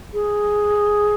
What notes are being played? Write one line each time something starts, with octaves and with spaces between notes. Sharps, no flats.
G#4